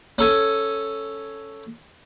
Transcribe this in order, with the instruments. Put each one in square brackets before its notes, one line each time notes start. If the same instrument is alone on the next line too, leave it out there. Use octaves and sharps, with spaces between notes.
[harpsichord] C#4 A4 G#5